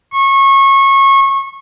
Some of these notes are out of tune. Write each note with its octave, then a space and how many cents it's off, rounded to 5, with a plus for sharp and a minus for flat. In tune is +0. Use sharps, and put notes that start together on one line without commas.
C#6 -25